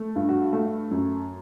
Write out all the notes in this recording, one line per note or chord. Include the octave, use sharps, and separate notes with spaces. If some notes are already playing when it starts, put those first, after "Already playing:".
Already playing: A3
G2
F#4
A3
F#2